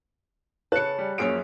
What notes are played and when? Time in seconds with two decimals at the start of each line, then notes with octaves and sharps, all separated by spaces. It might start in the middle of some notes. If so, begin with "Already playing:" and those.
0.72 C#3 C#5 A5 F#6 C#7
0.98 G3
1.18 F#2 F3 A#3 C#4 G#4 D7